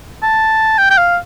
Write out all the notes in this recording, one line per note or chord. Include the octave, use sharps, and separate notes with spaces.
A5
G5
G5
F5